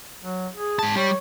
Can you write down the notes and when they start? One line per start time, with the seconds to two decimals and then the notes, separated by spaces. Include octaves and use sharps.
0.21 F#3
0.53 G#4
0.79 G#2 A5
0.95 G3 C#5